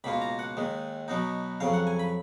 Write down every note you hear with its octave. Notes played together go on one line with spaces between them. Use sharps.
C#2 B2 A#3 F4 B5
A#5
F#5
D#2 D#3 G#3
B2 F#3 B3 D#4
F2 C#3 F#3 F5
F#5
G#5
B5